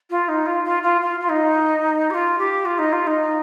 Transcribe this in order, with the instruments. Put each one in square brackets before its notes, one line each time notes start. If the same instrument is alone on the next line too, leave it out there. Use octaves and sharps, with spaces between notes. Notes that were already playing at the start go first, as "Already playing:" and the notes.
[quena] F4
D#4
F4
F4
F4
F4
F4
D#4
G4
F4
G4
F4
D#4
F4
D#4